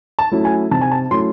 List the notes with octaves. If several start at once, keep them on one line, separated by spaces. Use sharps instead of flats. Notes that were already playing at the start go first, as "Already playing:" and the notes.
A5
F#3 A3 C#4 E4
G#5
C3 A5
G#5
A5
F#3 A3 C#4 E4 C6